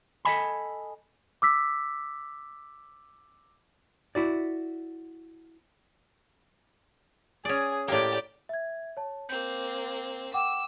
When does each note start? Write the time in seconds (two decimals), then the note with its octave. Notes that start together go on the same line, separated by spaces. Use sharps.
0.25 A4 B4 D#5 G#5 B5
1.42 D6 E6 B6
4.15 E4 F#4 D5
7.45 C#4 G#4 D5
7.88 A2 A#3 G4 D5
8.49 E5 G#6
8.97 C#5 A5
9.29 A#3 C4 G6
10.34 F#5 G5 D6 E6